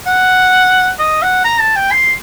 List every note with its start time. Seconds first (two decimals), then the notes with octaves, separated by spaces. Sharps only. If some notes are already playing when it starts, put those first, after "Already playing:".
0.06 F#5
0.99 D#5
1.22 F#5
1.44 A#5
1.60 A5
1.76 G5
1.91 C6